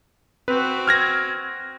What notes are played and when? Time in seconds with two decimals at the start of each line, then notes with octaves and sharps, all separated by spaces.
0.48 C4 F#4 B4
0.87 F6 G#6 A#6